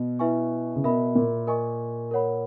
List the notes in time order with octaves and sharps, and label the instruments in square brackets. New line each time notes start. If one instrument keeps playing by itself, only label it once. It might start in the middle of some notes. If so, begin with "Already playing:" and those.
Already playing: [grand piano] B2
[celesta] E4 B4 E5 G#5 C#6
[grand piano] C#3
[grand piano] B2 [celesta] A#4 E5 B5
[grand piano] A#2
[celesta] A#4 D#5 G#5 C#6
A#4 C#5 F#5 B5